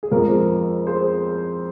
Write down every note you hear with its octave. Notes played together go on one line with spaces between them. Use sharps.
G#4
F2 F3 G#3 A#4
G#4 C5